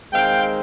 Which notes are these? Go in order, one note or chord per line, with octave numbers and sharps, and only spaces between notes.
D#3 G#3 C4 F5 G5